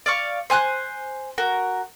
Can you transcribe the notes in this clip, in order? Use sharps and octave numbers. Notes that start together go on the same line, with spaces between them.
D5 F5 C#6
C5 G#5 F#6
F#4 A#4